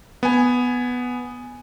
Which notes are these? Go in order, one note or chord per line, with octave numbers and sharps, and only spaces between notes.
B3 G#5